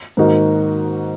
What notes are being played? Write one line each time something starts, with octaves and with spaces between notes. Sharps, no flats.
G#2 D#3 A#3 D#4 F#4